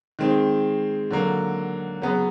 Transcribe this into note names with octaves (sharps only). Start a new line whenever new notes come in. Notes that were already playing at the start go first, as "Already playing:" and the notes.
D#3 G#3 C4
D3 F#3 A#3
C#3 F#3 B3